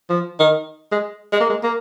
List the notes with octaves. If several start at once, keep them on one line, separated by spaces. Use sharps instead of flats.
F3
D#3
G#3
G#3
A#3
G#3
A#3